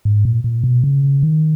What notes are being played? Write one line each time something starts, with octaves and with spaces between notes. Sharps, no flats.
G#2
A#2
A#2
B2
C#3
D#3